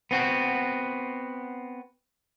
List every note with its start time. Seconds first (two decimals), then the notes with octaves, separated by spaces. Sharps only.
0.11 B3 C4 F#4